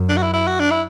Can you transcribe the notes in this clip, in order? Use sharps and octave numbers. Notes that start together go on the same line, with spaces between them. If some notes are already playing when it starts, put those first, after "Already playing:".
Already playing: F#2
D4
F#4
E4
E4
F#4
D4
E4